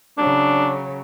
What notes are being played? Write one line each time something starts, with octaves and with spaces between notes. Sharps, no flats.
C#3 F#3 D4